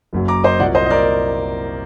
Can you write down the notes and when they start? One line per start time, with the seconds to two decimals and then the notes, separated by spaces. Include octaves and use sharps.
0.13 F#1 F#2 F#3
0.28 A#5 D6
0.44 C5 D#5
0.59 C2 A#2 F#3 D5 F#5
0.75 C5 D#5
0.86 D#5
0.90 A#4 D5